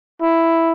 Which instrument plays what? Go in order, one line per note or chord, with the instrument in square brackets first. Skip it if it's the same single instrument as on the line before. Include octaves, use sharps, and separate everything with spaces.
[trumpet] E4